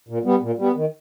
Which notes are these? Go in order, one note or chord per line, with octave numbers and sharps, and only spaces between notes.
A#2
G3 B3
A#2
G3 B3
D#3